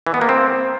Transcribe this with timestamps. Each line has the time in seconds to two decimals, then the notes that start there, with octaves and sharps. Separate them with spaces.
0.07 E3
0.14 B3
0.21 A#3
0.29 C4